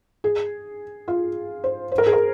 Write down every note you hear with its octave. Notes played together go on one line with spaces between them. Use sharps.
G#4
F4
C5
C5
A#4
G#4
A#4